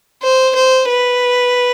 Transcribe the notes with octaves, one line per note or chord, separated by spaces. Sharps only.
C5
C5
B4